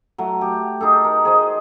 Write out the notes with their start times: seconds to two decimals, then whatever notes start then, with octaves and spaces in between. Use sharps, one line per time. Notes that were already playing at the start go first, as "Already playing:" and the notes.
0.18 F#3 A3
0.41 G4
0.81 D#4 G#4 A4
1.05 A#4
1.25 G#4 C5 D#5